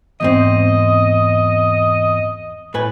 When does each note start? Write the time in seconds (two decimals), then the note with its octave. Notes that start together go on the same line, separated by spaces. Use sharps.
0.21 E2 G#2 C4 D#5
2.74 A2 B4 G#5